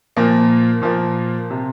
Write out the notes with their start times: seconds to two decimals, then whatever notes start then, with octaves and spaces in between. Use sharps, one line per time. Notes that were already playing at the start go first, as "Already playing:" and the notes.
0.17 A#2 F3 A#3
0.82 A#2 F3 A#3
1.51 C3